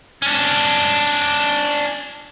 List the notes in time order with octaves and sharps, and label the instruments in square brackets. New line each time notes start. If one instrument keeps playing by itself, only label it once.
[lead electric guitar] C#4 D4